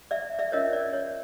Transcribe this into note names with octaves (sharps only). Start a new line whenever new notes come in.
D5 E5
D5 E5
C#4 F4 A#4 C#5 D#5
D5
C#5